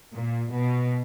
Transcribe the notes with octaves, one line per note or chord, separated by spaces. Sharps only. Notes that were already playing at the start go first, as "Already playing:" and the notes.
A#2
B2